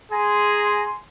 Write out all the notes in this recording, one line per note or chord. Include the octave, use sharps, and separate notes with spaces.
G#4 G#5 A#5 C6